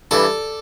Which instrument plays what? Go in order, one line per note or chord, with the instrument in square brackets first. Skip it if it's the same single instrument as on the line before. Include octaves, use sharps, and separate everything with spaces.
[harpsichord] G2 E3 A4 D5